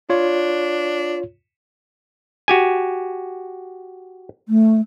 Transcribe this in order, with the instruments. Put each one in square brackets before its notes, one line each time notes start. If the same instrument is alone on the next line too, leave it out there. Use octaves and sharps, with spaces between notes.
[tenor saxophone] D4 [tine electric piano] F4 C#5
[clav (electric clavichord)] F#4 G4 G#5
[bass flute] A3